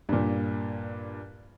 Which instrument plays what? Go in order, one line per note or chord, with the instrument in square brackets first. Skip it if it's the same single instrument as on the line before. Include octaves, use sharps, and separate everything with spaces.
[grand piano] G2 A#2